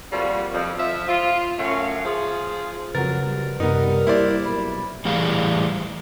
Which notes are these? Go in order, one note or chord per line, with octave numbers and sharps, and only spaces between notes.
F2 G3 A#3 F4 F#4
F2
F3 E5
F4
F#2 A3 C#4 F#4 F5
F3 F4 G#4
F2 C#3 F#3 A#4 B4 A6
G3
F#2 C3 B3 D#4 A#4
A#3 E4 G4 C5 D5
B1 B5
A2 E3 G3 G#4 F5